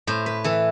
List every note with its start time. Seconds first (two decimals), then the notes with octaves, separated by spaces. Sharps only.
0.07 A2 C5
0.26 B4
0.44 E3 A4